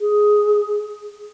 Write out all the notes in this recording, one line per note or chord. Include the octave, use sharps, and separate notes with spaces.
G#4